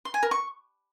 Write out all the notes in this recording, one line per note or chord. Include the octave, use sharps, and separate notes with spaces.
C6
G#5
A#4
C#6